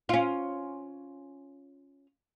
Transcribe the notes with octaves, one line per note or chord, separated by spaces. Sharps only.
C#4 F4